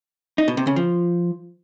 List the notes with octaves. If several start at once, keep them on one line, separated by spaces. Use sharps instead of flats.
D#4
B2
C3
C#3
F3